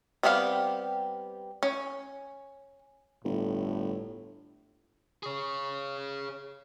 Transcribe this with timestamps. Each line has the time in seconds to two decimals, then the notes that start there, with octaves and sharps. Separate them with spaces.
0.23 G3 B3 C4 G4 F5
1.63 C#4
3.25 G1 A2
5.23 G#4 C#5